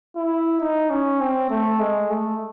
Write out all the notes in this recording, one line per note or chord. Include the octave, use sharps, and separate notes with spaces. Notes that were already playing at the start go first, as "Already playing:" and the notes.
E4
D#4
C#4
C4
A3
G#3
A3